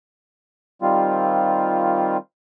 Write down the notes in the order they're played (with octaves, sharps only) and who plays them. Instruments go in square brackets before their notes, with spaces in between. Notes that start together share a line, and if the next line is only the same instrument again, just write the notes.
[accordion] D#3 G3 C4 F4